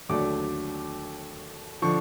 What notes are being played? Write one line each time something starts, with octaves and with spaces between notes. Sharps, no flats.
D#2 D3 F#3 A3 D4 D6
D3 F3 C#6